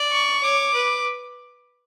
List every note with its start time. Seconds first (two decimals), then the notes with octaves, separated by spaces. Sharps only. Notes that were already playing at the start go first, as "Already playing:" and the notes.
Already playing: D5
0.12 C#6
0.43 C#5 D6
0.74 B4